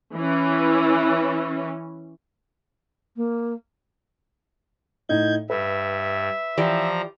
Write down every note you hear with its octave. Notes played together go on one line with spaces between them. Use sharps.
E3 C#4
A#3
A2 D#4 G6 G#6
G2 B4 E5
E3 F3 G4 D5 A#5